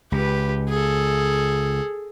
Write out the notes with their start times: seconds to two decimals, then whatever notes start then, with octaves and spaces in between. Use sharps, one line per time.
0.12 C#2 G4 B4
0.69 G#4 A4